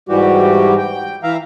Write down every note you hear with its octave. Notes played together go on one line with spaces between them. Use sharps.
G#2 E3 G3 F#4 G4
G5
E3 E5 F5 A#5